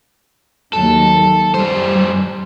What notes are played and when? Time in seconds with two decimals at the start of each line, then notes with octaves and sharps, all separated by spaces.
0.73 D#2 F#3 A4
1.54 F#2 G3 C5